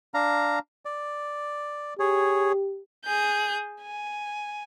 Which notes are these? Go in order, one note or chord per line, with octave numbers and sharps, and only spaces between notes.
D4 F5 A#5
D5
G4 G#4 C#5
G#4 G6
G#5